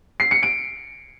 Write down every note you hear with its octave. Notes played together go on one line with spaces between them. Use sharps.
C7
C#7
D7